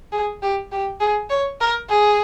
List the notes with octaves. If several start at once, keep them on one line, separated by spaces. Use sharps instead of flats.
G#4
G4
G4
G#4
C#5
A#4
G#4